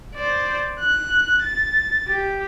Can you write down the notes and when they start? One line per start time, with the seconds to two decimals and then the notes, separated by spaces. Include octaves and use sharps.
0.15 C5 D5
0.79 F#6
1.42 A6
2.08 G4